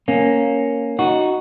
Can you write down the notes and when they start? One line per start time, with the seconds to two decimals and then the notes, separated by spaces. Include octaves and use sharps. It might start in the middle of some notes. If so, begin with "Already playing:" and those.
0.08 A#3 C#4
0.99 D#4 F#4